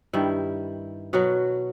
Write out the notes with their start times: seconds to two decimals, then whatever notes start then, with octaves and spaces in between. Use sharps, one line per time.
0.13 G2 D#3 G3 E4
1.13 B2 F#3 F#4